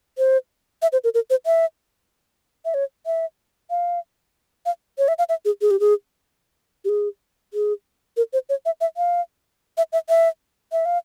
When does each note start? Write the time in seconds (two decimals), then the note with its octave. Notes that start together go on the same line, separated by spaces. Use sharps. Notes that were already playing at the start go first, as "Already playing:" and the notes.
0.18 C5
0.82 E5
0.93 C5
1.04 A#4
1.14 A#4
1.30 C5
1.46 E5
2.65 E5
2.74 C#5
3.06 E5
3.70 F5
4.66 F5
4.98 C#5
5.08 E5
5.18 F5
5.29 E5
5.45 G#4
5.61 G#4
5.71 G4
5.80 G#4
6.85 G4
6.89 G#4
7.54 G#4
8.17 A#4
8.33 C5
8.49 C#5
8.66 E5
8.81 E5
8.97 F5
9.77 E5
9.93 E5
10.09 E5
10.72 E5
10.85 F5